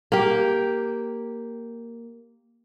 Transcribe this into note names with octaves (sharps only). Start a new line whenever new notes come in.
A#3 G4